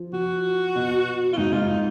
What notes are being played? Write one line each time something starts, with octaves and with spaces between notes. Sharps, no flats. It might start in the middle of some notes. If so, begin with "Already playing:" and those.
Already playing: F3
F3 F#4
B2
F4
G#2 D#4
G#2 F4
D#4